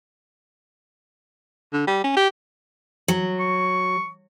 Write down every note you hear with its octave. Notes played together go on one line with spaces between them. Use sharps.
D3
G3
C#4
G4
F#3
C#6